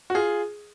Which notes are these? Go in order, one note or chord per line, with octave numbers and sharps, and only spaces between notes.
F#4
F4 G#4